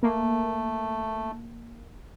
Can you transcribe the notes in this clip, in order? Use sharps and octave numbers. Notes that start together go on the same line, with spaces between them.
A3 A#3